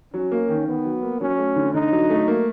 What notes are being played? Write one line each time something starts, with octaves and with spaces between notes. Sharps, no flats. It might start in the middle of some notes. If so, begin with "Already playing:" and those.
F#3 C#4
A#3
D#3
D#3 B3
F#3
A#3
F#3 C#4
A3
D3
D3 D#4
F#3
A3
A#3